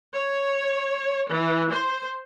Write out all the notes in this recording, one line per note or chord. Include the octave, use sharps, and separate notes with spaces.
C#5
E3
C5